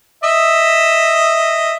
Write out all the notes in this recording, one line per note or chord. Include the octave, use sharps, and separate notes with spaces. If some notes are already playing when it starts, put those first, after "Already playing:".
D#5 E5